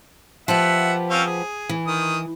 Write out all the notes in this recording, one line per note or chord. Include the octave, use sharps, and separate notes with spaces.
F3 B3 G4 E5 F#5
C4 C#4 F5
G#4
E3
D#3 D#6